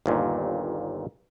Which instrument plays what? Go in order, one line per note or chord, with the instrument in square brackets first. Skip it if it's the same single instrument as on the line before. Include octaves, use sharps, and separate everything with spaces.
[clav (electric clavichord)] G1 D#2 A#2